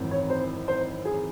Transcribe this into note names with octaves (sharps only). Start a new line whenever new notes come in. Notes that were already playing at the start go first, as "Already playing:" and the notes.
Already playing: G#1 F#2 E3 C4 D#4
C#5
C5
C5
G#4